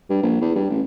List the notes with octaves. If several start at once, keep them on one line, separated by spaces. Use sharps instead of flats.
G2
A#1
E2
G2
A1